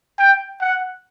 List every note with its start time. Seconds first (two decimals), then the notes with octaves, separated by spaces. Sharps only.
0.19 G5
0.61 F#5